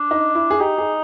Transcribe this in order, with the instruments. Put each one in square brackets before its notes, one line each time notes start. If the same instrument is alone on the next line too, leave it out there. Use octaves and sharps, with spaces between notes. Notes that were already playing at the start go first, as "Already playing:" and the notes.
Already playing: [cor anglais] D4
[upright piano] D#4
E4
G#4
[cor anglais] D#4 [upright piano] G4
[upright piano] G#4